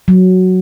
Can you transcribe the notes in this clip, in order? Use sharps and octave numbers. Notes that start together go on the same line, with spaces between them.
F#3